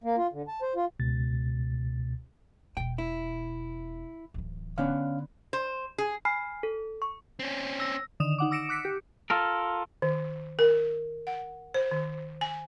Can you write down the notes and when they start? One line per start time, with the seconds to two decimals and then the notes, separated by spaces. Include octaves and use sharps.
0.04 A#3
0.17 F4
0.33 D3
0.48 A5
0.62 C5
0.76 F4
0.99 C#2 B2 A6
2.77 E1 B2 G5
2.98 E4
4.34 D1 E3
4.78 D3 B3 C#4 D4 F5
5.53 C5
5.98 G#4
6.25 G#5 B5 F6 C7
6.63 A4
7.02 C#6
7.39 C4 C#4
7.80 E6 A#6
8.20 D3 D#3 D#6 E7 F7
8.38 D#4 F#5 D6
8.51 D6 E6 A#6 C#7 D7 E7
8.69 D6 F#6 B6 C#7 D7
8.85 G4
9.30 F4 A4 A#4
10.02 D#3
10.59 A#4
11.27 F#5
11.74 C5
11.91 D#3
12.41 G#5